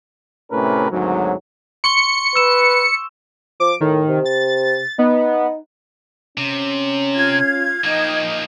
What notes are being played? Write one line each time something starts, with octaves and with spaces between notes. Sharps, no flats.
A2 C3 A3 C#4 A#4 B4
G#1 D2 G#2 F#3
C6 C#6 C#7 G7
B4 E6 E7
F3 D6
A2 D#3
C3
A6
B3 D#4
C3 C#4
F4 F5 G#6
F3 A#3 D#4 D#5 G5